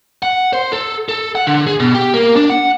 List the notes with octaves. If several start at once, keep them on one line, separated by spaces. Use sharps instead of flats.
F#5
C5
A4
A4
F#5
D3
G#4
B2
G4
A#3
D4
F#5